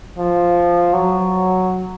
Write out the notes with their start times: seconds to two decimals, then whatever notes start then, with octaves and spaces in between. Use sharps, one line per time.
0.18 F3
0.93 F#3